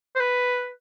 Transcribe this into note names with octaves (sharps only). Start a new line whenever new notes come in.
C5
B4